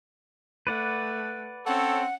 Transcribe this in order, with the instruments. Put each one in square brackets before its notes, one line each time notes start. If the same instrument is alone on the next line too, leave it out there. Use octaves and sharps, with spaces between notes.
[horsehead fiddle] A3 [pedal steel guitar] B4 D5 F#5
[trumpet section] C4 A4 C#5 [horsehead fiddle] C#4 [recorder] F#5